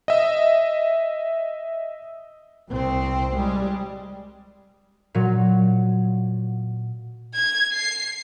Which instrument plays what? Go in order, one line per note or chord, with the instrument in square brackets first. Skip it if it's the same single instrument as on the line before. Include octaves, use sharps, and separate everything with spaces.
[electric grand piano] D#5 E5
[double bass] C2 C4
G3 G#3
[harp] A#2 F#3
[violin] G#6
C7